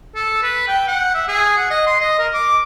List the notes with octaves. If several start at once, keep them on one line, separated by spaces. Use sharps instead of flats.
A4
B4
G5
F#5
E5
G#4
F#5
D#5
C6
D#5
A#4
D6